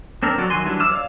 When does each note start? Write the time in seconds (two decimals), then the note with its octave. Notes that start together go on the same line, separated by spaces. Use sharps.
0.23 C4 D4 A4 A#4
0.38 F#3 F#4 D5
0.50 D#3 F#3 F#4 G#5 C6
0.65 E3 F#3 G3 D4
0.80 D6 E6 F6
0.92 C#5 D5 F5